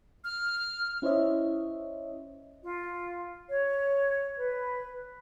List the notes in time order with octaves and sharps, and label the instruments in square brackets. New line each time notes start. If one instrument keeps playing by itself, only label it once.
[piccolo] F6
[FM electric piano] C#4 E4 C5 C#5 D#5 E5
[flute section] F4
C#5
B4